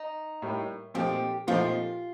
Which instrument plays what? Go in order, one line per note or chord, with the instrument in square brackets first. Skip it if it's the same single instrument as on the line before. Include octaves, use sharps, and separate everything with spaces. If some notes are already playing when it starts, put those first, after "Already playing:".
Already playing: [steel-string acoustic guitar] D#4
[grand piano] A2 G3 A#3
[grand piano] A#2 F3 A3 C4 D#4 [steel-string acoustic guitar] G4
[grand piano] A#2 F3 A3 C4 D#4 [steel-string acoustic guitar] F4